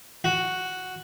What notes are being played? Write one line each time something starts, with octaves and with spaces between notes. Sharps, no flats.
F#4